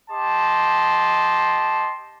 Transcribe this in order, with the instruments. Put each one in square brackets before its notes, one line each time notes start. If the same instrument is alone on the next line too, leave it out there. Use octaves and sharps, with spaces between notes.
[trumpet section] G4 D#5 A5 C6